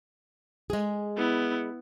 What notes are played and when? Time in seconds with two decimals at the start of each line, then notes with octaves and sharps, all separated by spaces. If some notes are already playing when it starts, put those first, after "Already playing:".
0.70 G#3 G#4
1.17 B3 E4